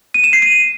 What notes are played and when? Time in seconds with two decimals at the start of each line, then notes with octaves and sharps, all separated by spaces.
0.14 D#7
0.24 E7
0.33 C7
0.42 D#7